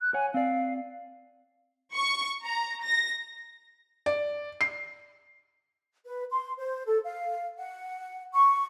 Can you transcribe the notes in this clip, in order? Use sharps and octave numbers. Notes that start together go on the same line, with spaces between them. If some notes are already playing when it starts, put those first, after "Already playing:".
F#6
C#5 F#5 G#5
C4 D5 F5
C#6
A#5
A#6
D5
C7
B4
C6
C5
A4
F5
F#5
C#6